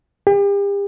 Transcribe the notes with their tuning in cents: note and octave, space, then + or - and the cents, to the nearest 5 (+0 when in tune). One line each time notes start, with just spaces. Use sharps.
G4 +40